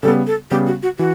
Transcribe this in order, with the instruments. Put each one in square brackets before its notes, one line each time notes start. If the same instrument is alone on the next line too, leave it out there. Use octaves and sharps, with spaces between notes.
[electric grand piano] C#3 G3 B3 [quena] A4
[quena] A4
[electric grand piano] C#3 G3 B3 [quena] G4
[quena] F#4
F#4
[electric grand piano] E3 [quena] F#4